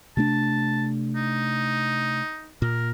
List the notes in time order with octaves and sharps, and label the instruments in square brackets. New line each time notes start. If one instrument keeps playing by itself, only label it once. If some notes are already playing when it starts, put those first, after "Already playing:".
[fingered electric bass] C3 A3 D4 [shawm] A5
[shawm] D#4
[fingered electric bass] A#2 [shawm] A#4